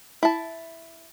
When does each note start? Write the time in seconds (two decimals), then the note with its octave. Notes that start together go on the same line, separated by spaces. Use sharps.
0.23 E4 A5